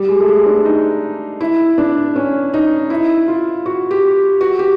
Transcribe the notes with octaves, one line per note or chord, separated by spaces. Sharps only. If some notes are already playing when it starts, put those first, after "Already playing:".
Already playing: G3
G#3
A3
G#3
D4
D#4
E4
D4
C#4
D#4
E4
F4
F#4
G4
F#4
G4